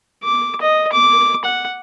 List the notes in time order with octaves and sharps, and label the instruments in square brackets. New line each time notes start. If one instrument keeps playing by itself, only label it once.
[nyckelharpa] D6
D#5
D6
F#5